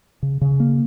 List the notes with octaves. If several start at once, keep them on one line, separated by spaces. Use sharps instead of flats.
C#3
C#3
A#3